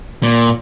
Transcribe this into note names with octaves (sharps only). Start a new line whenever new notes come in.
A#2